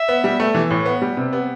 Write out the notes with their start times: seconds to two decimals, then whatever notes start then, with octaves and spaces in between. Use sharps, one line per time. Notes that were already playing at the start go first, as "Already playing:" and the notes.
Already playing: E5
0.08 B3
0.24 G3
0.40 A3
0.54 E3
0.70 A2
0.85 B3
1.02 G3
1.17 C3
1.33 B3